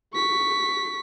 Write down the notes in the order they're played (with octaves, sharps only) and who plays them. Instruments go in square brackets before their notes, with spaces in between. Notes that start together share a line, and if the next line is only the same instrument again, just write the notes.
[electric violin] C#6 B6